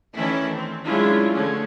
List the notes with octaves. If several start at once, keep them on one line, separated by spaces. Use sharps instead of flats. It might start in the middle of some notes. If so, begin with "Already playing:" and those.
D#3 E3 A3 C#4 D4 E4
C4
F#3 G#3 C#4 D4 E4 F4
D3 F3 G#3 A3 C#4